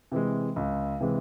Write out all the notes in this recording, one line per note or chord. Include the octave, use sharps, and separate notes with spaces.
C3 E3 G#3
C#2
C3 E3 G#3